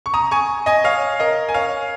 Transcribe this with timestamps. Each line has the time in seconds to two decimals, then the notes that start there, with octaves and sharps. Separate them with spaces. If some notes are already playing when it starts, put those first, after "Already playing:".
0.06 C#6
0.14 A#5 D#6
0.31 G#5 C#6
0.66 D#5 G#5
0.84 C#5 F5
1.20 A#4 D#5
1.49 G#5
1.54 C#5 F5